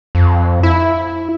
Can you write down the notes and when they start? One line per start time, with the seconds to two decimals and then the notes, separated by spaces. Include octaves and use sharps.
0.15 F2
0.63 E4